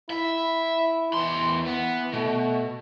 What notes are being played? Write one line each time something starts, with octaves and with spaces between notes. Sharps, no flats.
E4 E5
E2 E3 C6
B3
B2 A3